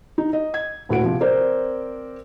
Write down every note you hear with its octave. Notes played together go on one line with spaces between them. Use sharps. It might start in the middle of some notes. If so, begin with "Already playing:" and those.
D#4
D#5
G#6
D#1 A2 F#4 F#5 D7
C3 F3
C4 A#4 C5 D5